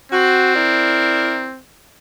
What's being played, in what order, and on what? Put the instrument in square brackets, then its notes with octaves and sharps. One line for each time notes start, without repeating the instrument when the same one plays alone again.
[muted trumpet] C4 [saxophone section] F#4
[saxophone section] E4 A#4 D5